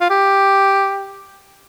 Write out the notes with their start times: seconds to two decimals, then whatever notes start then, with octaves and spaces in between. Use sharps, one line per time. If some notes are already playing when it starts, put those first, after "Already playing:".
0.01 F4
0.10 G4